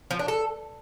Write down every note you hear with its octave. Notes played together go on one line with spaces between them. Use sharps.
F3
D4
A4